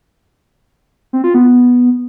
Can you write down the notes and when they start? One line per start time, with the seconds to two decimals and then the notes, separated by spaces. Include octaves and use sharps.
1.13 C4
1.24 F4
1.34 B3